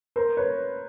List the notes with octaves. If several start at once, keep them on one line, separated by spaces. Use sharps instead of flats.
A#4 C5
B4 C#5